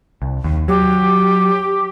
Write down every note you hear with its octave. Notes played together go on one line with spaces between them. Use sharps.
C2
D#2
F#3 G4